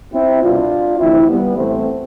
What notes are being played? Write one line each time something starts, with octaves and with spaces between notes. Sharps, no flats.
C4 E4
C2 B2 D4 F4
D2 C3 E3 C4 E4
G3 B3
A1 A2 E3 A3 C4